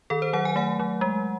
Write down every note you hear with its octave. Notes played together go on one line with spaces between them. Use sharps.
D#3 A4
C5
F#3 F#5
G#5
A3 F#5
F#3
G#3